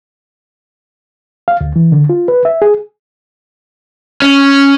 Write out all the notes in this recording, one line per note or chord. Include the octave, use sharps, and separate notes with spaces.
F5
D2
E3
D3
F4
B4
E5
G#4
C#4